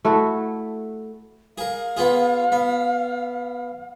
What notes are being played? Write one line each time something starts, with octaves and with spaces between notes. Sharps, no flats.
A3 E4 F#4 A4
G#4 A#4 F5
B3 F4 G#4
B3